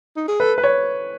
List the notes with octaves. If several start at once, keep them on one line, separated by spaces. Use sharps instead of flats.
D#4
G#4
A4 B4
B4
C#5